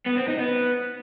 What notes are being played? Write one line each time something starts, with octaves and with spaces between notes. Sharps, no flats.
B3
C4
D#4
B3